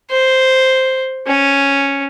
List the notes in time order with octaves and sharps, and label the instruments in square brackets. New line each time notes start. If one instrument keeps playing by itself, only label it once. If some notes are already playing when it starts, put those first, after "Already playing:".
[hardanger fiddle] C5
C#4